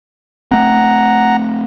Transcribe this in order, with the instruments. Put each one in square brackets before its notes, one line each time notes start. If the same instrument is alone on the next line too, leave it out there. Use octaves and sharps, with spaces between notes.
[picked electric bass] A3 C4 [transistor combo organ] F#5 A#5